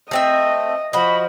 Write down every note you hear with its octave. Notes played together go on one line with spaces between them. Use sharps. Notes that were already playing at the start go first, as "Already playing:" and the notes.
A3 C4 D#5 E5
F3 F#4 D#5 B5